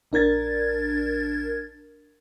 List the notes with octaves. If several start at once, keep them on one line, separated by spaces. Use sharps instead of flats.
A#1 D4 A#4 G#6 A6